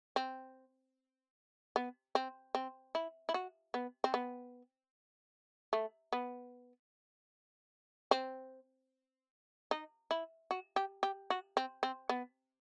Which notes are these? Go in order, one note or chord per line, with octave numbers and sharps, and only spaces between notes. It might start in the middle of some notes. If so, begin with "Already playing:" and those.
C4
B3
C4
C4
E4
E4
F#4
B3
C4
B3
A3
B3
C4
D#4
E4
F#4
G4
G4
F#4
C4
C4
B3